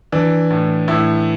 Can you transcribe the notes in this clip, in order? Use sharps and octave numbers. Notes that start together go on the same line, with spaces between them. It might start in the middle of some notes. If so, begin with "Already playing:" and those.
E3 D4
A2
A2 E4